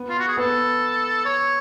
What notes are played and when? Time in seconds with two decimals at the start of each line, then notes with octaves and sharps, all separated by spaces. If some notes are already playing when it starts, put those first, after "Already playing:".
Already playing: B3
0.09 F4
0.19 F#4
0.28 G#4
0.37 B3 A4
1.26 C#5